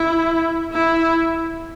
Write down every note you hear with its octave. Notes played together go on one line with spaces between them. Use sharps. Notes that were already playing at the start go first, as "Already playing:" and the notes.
Already playing: E4
E4